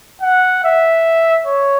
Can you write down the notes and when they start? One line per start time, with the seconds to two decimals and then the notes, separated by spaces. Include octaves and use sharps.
0.22 F#5
0.64 E5
1.46 C#5